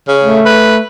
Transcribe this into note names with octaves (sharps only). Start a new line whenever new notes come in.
C#3
A3
B4